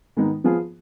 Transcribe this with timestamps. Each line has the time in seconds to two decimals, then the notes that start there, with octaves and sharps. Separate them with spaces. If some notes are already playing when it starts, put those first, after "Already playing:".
0.17 G#2 D#3 G#3 B3 D#4
0.44 F3 B3 F4 G#4